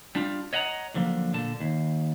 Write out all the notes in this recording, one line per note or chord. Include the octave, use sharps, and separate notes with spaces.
G3 D4 F4
C#5 D#5 F#5 G#5 A#5
A2 D3 F3 F#3 A#3
A#2 D3 A5
D#2